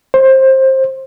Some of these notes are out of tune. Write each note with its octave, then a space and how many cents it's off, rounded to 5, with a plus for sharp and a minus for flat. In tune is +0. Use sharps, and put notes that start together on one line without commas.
C5 +20